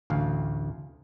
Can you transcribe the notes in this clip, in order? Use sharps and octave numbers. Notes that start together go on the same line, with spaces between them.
A1 D2 F5